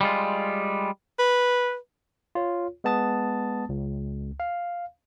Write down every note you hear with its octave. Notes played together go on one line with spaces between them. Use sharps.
G3 G#3 F4
B4
F4 C#5
G#3 B3 A5 D#6 A6
C#2
F5